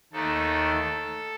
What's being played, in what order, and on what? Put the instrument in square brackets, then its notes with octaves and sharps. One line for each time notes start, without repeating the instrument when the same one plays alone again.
[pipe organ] D#2 D#3 A3 A4